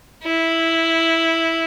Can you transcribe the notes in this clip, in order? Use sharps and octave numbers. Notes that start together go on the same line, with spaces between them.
E4